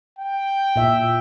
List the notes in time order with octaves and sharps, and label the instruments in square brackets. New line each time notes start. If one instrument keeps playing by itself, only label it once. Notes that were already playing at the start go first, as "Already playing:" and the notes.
[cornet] G5
[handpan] A#2 E5